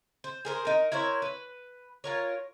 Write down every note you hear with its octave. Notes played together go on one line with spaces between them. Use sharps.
C5
G#4 A#4 C5
D#4 A#4
E4 A#4 C5 C#5
B4
F4 A#4 C#5